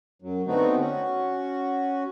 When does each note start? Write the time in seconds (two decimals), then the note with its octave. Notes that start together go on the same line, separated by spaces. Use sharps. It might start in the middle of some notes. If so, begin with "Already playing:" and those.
0.22 F#2 F#3
0.47 D3 A3 B3 C4 D#4 F#4
0.80 C#4 F#4